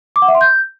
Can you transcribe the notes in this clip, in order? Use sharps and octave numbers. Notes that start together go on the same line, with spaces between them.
D6
F#5
E5
C6
G6